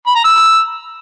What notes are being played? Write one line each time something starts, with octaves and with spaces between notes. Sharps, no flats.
B5
A#5
E6